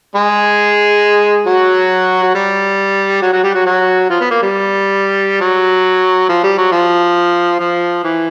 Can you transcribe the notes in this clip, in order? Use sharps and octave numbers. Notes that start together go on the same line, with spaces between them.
G#3 G#4
F#3 F#4
F#4
G3 G4
F#3 F#4
F#3 F#4
G3 G4
F#3 F#4
F#3 F#4
F3 F4
B3
A#3
G3
F#3
F3
G3
F#3
F3
F3
E3